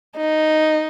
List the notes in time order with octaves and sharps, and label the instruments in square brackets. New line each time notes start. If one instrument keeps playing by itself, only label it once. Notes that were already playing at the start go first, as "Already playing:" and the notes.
[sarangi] D#4